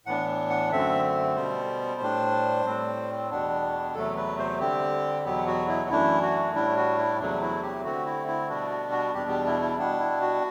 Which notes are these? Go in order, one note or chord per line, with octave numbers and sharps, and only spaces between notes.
A2 E3 B3 D4 F#5
F#5
F#2 D3 A3 C4 E5
B2 G3 B3 C5
A2 G3 D4
A2 G3 C4
E2 B2 G3 B3 D4
E2 C3 F#3 A3 A4
B4
C5
D3 G3 C4 G4
E2 B2 F#3 B3 G4
F#4
E4
F#2 E3 A3 D4 E4
F#4
A2 G3 D4 E4
F#4
E4
E2 C3 F#3 A3 D4
E4
G4
D3 A3 C4 F#4
E4
E4
B2 G3 B3 D4 F#4
F#4
F#4
E2 B2 G3 B3 D4 G4
G4
E4
E4
B2 G3 B3 D4
E4
F#4